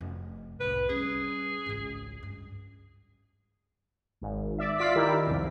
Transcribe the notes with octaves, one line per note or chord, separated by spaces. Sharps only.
F1
C2 A2 B4
G3 C#4 G#4
G#1 C#2
G2
G#1
D5 E5
F4 D5 E5 B6
D#3 E4 G4 A#4
C2 F2